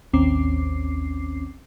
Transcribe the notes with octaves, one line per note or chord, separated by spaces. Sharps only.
A1 D#2 C4 C#4 D6 C7